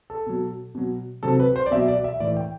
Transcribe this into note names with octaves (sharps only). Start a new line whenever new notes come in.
A4
B2 F#3
B2 F#3
C3 F#3 A4
B4
C5
D5
B2 F#3 E5
D5
E5
A2 E3 D5
G5